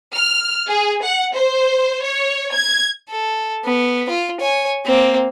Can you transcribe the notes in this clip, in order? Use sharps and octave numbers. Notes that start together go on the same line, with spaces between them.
F6
G#4
F#5
C5
C#5
G#6
A4
B3
F4
C#5 G#5
A#3 C4